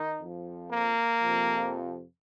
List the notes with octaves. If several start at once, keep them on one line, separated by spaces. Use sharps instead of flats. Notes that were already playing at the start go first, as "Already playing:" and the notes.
Already playing: D#3 D#4
F2
F3
A#3
F2 C3 F3